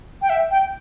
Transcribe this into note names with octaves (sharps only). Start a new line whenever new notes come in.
G5
E5
G5